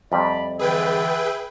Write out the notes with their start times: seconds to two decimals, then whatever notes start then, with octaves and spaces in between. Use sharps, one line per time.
0.12 F2 C3 G3 D5 B5
0.59 D3 E3 G#4 B4 E5 G5